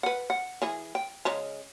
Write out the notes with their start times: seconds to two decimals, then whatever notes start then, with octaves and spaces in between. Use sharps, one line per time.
0.03 B4 F#5
0.30 F#5
0.62 E3 G#4
0.95 G5
1.25 C#3 G#3 A#5